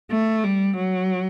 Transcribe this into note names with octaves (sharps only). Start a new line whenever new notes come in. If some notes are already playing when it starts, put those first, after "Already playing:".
A3
G3
F#3